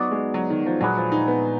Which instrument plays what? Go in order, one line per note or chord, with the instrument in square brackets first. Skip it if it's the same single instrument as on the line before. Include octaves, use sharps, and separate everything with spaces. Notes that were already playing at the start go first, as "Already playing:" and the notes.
Already playing: [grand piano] F#3 [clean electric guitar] B3 D#4 F#4 D5
[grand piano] G#3
F#3
D#3
F3
[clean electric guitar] A#2 G#3 D4 G#4 B4 [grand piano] F#3
[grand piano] F3
D#4
B3